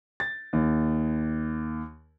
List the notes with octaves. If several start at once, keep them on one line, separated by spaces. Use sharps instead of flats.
A6
D#2